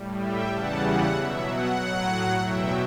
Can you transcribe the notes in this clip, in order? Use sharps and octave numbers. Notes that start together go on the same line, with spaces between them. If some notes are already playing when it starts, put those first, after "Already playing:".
Already playing: A2 G3
E5 G5
E2 C#3 E3 G3 F#5 A5
F#5
B2 F#3 E5
F#5
A2 F#3
E2 B2 F#3 E5 G5